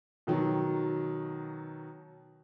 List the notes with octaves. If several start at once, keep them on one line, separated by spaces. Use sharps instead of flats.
B2 D#3 F#3